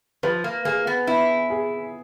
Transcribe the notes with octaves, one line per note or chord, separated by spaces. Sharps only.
F3 B4
A#3
A#3 G#4
B3
B3 E4
G#4